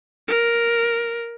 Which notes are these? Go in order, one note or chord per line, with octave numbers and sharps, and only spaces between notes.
A#4